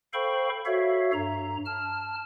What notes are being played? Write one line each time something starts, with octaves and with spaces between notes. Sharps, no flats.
A4 C5 F5 G5 B5 C#6
F#4 A4 C#5 E5 F5
G2 A#5
A5 F6